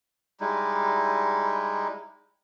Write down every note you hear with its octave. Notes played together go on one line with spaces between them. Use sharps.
G3 G#3 D#4 E4